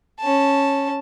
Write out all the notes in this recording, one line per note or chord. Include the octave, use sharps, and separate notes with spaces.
C#4 A5